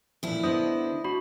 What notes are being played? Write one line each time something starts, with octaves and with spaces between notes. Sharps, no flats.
D2 A#2 E3 F3 E4
D3 B3 D4 C5 D#5 D#6
D4 F#4 B5